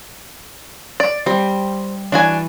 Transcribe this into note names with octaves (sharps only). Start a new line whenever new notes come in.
D5
G3 C4
E3 D4 F#4 G#5